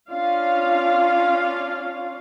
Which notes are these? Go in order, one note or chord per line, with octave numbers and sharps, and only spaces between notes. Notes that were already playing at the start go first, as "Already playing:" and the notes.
C#4 D4 F4 F5